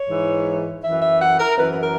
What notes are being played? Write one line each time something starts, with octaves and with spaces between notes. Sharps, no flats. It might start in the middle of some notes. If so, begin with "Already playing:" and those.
Already playing: C#5
G#2 E3
F#2 E3 E5
E5
F#5
A#4
F#2 E3 B4
B4
A#4